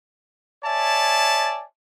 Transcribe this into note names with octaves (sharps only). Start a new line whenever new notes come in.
C#5 D5 E5 G#5 A5